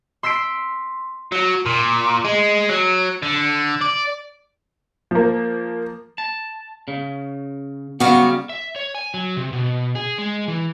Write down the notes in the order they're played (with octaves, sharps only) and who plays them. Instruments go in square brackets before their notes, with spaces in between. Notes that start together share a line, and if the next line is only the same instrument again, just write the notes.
[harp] C6 E6 B6 C7 D7
[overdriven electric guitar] F#3
A#2
G#3
F#3
D3
D5
[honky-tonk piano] F3 A#3
[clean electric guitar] A5
C#3
[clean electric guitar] C#3 F#3 G3 [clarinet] B3 [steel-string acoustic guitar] F#4 F5
[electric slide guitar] E5
C#5
G#5
F#3
C3
B2
G#4
G#3
E3